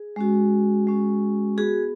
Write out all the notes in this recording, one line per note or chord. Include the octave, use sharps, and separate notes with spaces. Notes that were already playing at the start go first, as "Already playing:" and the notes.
Already playing: G#4
G#3 C#4 F#4
G#3 C#4 F#4
B3 F#4 G#4